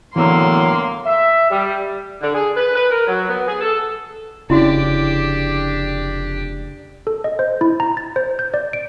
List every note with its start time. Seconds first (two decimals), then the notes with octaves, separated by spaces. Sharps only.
0.16 A2 D3 E3 F#3 A#3 B3 C6 E6
1.06 E5
1.51 G3
2.21 D3
2.34 G#4
2.57 B4
2.76 B4
2.90 A#4
3.07 F#3
3.28 B3
3.47 G#4
3.61 A4
4.50 F1 C#3 D4 E4 F#4 G4
7.07 A4
7.24 D#5
7.39 C5
7.61 E4
7.80 A#5
7.97 A6
8.16 C5
8.39 G6
8.54 D5
8.73 D7